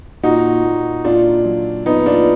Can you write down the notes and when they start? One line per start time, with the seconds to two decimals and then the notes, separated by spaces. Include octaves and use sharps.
0.24 A#2 D#4 F#4
0.64 A#2
1.05 A#2 D4 F4
1.45 F#3
1.85 A#2 B3 D#4
2.06 D4 F4